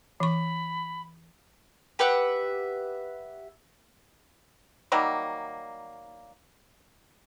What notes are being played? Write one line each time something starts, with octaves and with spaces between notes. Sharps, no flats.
E3 B5 C#6
G4 B4 E5 F#5
D#3 F#3 G3 A#3